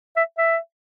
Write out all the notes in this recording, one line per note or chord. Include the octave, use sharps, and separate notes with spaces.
E5
E5